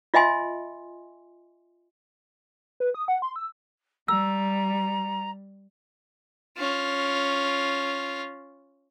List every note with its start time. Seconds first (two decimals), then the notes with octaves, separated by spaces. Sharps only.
0.14 F4 D#5 E5 G#5 C6
2.80 B4
2.94 D#6
3.08 F#5
3.22 C6
3.36 E6
4.08 G3 A#5 E6
6.57 C#4 F4